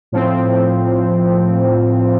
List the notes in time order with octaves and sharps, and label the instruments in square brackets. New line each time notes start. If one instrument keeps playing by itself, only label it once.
[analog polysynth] A2 F3 C4